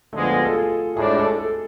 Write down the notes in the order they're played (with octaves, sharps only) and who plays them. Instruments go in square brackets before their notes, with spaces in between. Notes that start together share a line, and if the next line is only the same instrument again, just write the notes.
[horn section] D3 F3 G#3 B3 [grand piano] A3
[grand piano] F4
G#4
A4
G#4
[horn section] A2 G#3 D4 [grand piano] G#4
[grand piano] A4
A4